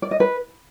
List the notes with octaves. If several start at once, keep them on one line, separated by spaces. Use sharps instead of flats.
D5
D#5
B4